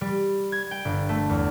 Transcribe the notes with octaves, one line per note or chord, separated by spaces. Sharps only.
G3
G#6
G5
G1
A3
E2